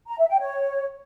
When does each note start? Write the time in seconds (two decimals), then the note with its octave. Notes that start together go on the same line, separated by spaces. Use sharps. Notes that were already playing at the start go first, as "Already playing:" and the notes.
0.08 A#5
0.18 E5
0.29 G5
0.40 C#5